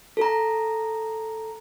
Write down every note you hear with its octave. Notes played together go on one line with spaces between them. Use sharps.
A4 A#5